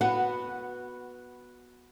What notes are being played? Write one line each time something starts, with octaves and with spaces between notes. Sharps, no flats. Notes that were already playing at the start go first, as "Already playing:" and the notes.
B3 F#4 B4 F#5